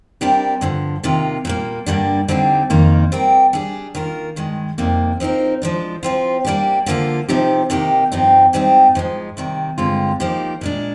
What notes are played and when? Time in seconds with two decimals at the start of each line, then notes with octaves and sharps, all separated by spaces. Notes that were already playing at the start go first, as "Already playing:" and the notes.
0.21 C3 G3 D4 G4 A#4
0.61 G2 D3 F3
1.03 C3 D#3 A#3 F4
1.45 A#2 G3 A#3
1.86 G2 D3 G3 A#3 D4
2.28 D3 G3 C4 D#4 G4
2.70 F2 D#3 A#3 D#4
3.12 G3 C4 G4 A#4
3.53 G3 D4 G#4
3.95 D#3 A#3 F4 A#4
4.36 G2 D#3 G#3
4.78 F2 C3 G3 A#3 D#4
5.20 F3 C4 D#4 A#4
5.62 F3 G#3 D4
6.03 F3 C4 F4
6.45 G3 A#3 D4 G4
6.86 D3 F3 A#3 F4
7.28 C3 F3 C4 D#4 G4
7.70 C3 D#3 A#3 D#4 G4
8.12 G2 F3 C4 D#4 G4
8.53 G#2 G3 C4 D#4 G4
8.95 G#2 F3 G#3
9.37 C3 D#3 G3
9.78 G2 D3 G#3 C4 F4
10.20 F3 A#3 D#4 G4
10.61 A#2 G#3 D4